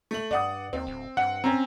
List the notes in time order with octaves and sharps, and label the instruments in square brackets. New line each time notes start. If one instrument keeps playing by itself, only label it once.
[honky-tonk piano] A3 F#7
[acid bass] G2 [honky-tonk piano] D5 F#5 D#6
[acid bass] D#2 [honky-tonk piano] C4
[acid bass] D1
[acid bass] G2 [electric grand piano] F#5
[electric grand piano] C4 C#4 [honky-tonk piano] A#5